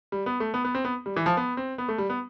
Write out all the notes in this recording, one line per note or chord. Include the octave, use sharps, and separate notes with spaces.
G3
B3
A3
B3
B3
C4
B3
G3
E3
F3
B3
C4
B3
A3
G3
B3